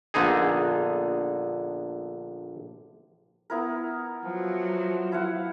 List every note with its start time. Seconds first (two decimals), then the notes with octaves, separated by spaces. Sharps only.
0.14 A#1 D3 B3 D#4 G#4
3.50 B3 E4 A#4
4.25 F3 F#3
5.12 E4 F5 F#5